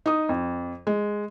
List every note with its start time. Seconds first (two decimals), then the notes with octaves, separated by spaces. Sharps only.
0.06 D#4 D#6
0.29 F2
0.87 G#3